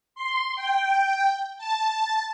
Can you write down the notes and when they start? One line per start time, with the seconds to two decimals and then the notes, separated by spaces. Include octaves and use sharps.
0.15 C6
0.56 G5
1.58 A5